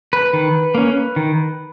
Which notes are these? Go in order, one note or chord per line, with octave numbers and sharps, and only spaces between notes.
B4
D#3
A#3 C#4
D#3